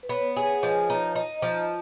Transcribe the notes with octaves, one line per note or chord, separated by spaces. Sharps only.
B4
B3 C#5
G#4
F3 D#5
D#4
D#4 D#5
F3